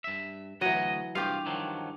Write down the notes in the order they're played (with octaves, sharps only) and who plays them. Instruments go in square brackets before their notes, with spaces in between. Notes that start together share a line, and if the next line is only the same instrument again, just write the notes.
[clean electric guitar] G2 E5
[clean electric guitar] D2 F#4 D#5 [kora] E3 F#3
[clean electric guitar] C2 F4 F5 [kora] G2 G4
[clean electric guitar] D#3 F3 F#3